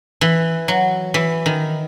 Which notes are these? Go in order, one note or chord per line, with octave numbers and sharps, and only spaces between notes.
E3
F#3
E3
D#3